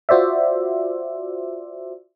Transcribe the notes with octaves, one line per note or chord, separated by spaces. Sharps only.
F4 F#4 C5 D5 E5